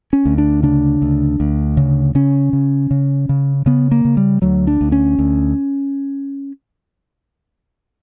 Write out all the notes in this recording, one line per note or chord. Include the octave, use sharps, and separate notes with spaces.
C#4
D2
D4
C#3 D4
D2
D2
C#3
C#3 C#4
C#3
C#3
C#3
C#3 B3
A#3
C#3
G3
D2 F#3
D4
D2
C#4
D2